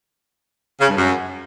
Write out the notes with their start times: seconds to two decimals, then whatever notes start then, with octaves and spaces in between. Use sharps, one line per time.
0.81 C#3
0.89 G2
0.98 F#2